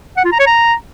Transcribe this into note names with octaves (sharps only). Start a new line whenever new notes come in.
F#5
F4
A#5
C#5
A#5